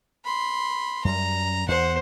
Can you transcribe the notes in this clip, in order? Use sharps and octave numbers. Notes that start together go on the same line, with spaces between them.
B5 C6
F#2 G3 A#5
E2 C5 F#5